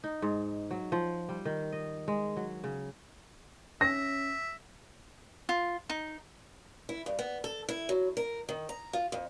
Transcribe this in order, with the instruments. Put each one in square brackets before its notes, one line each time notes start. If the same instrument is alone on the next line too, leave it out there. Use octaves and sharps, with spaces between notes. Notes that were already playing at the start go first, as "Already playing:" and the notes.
[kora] D#4
G#2
F#3
F3
G3
D#3
D#5
G#3
F#3
C#3
[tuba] C#4 [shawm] E5 [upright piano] A#6
[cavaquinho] F4
D#4
[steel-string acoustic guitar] E4
G2
B3
A4
E4
F#3
A#4
D#3
A#5
F4
F2